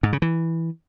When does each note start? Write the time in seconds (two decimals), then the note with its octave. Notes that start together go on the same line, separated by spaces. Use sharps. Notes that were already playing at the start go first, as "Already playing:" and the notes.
0.03 G#2
0.13 C#3
0.22 E3